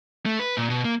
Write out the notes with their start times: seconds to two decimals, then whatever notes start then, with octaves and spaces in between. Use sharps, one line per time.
0.26 A3
0.39 B4
0.57 A#2
0.70 B2
0.85 A#3